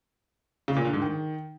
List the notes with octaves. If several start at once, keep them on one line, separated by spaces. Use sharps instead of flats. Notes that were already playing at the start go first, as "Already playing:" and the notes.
C#3
A#2
D3
G#2
D#3